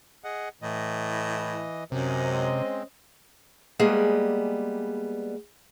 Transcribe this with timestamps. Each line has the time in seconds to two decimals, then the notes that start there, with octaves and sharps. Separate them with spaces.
0.24 G#4 D#5 F#5
0.62 A2 E3 D#5
1.92 F#2 C3 C#4 C5 D#5
2.30 G#3 C4
3.79 G3 G#3 A#3 B3 G#4